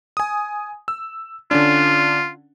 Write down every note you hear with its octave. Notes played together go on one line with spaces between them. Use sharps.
G#5 D#6
E6
D3 C#4 D4 F4